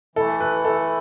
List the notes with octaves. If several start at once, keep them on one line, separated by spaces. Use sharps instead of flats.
E3 A3 E4 A4
B4
A4